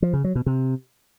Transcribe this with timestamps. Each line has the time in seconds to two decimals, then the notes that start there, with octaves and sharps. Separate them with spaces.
0.02 F3
0.13 C#3
0.24 F#3
0.35 B2
0.46 C3